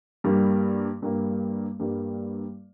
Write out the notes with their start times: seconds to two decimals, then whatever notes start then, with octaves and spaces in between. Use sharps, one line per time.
0.24 G2 G3 A#3
1.02 G2 G3 A#3
1.80 G2 G3 A#3